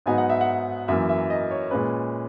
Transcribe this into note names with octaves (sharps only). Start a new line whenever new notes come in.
G#2 F#3 B3 D#4 G#5
F#5
E5
F#5
F#2 E3 A#3 E5
E5
D#5
C#5
A#2 G#3 C#4 B4